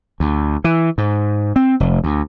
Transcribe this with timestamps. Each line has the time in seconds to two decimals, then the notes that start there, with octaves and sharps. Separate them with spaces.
0.20 D2
0.64 E3
0.98 G#2
1.56 C4
1.80 F1
2.04 D2